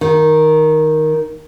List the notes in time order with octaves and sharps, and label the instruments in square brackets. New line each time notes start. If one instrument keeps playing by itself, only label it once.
[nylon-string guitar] D#3